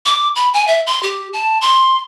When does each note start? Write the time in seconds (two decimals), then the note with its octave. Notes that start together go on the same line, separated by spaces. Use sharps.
0.06 D6
0.36 B5
0.54 G#5
0.67 E5
0.87 C6
1.03 G4
1.33 A5
1.61 C6